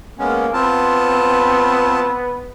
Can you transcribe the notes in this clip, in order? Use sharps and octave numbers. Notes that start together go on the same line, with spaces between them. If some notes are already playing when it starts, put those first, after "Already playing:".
G#3 A#3 B3 C#4
B3 C4 F4 A5